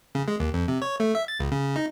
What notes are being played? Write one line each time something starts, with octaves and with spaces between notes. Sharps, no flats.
C#3
G#3
D#2
F2
C3
C#5
A3
E5
A6
C#2
C#3
D#4